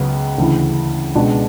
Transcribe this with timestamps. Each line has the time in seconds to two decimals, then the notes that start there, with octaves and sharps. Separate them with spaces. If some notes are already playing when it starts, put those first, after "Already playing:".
Already playing: C#2 C#3 F#3 B3
0.38 D2 C#3 E3
1.15 C#2 B2 G#3 D4